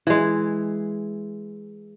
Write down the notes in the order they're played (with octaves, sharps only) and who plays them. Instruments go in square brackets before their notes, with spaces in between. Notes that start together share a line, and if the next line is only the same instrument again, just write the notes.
[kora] E3 G#3